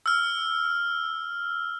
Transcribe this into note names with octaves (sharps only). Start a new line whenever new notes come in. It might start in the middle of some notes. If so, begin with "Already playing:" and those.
E6 F6